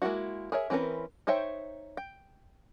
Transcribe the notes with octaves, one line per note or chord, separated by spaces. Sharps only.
G#3 A#3 C4 E4 F#4
G#4 A#4 C#5 E5
E3 C4 C#4 A#4 B4
D#4 C5 C#5 E5 G5
G5